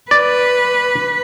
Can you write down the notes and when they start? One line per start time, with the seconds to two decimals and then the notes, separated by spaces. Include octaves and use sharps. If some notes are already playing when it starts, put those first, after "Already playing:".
0.11 B4 D5